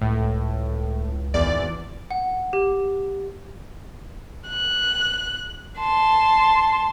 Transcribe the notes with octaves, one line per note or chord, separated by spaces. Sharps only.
C#2 A2
G#1 E2 D5
F#5
G4
F#6
A5 C6